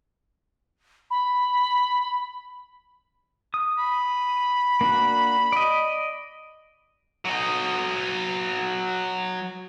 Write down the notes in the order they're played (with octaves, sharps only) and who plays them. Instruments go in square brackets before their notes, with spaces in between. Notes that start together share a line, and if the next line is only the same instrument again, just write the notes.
[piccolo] B5
[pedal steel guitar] D#6
[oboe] B5
[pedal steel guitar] A#3 D4 F#4
D5 D#5
[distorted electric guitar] F#3 D#5